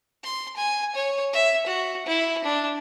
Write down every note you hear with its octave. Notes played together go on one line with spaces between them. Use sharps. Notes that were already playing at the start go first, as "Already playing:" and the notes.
C6
G#5
C#5
E5
F#4
E4
D4